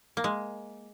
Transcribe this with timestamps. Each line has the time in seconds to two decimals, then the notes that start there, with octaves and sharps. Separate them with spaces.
0.17 A#3
0.24 G#3